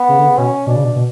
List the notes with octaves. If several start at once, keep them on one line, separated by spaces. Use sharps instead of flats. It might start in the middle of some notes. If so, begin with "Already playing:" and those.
Already playing: B3
C#3
D3
C#3
B2 C#4
B2 D4
C#3
B2
B2